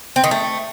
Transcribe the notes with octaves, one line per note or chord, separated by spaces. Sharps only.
C4
D#3
A3